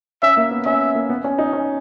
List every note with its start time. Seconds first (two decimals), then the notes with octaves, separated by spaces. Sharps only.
0.22 C#4 E5
0.37 A#3
0.51 B3
0.65 C#4 E5
0.95 A#3
1.09 B3
1.24 C#4
1.38 D#4
1.53 C#4